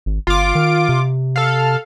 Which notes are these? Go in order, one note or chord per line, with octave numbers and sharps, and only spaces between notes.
G#1
G1 F4 D6
D#3
C3
A4 F5